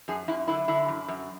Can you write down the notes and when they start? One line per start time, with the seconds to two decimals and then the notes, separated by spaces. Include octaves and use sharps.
0.08 F#2 G#4
0.28 F#2 E4
0.48 D3 E4
0.68 D3 E4
0.88 F#2
1.08 F#2